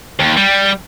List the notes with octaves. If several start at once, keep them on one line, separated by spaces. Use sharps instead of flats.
D#2
G3